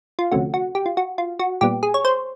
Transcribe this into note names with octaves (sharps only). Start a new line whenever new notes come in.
F4
D2 C3 F3 A3 C#4 F#4
F#4
G4
F4
F#4
F4
F#4
A#2 G3 B3 G4
G#4
C#5
C5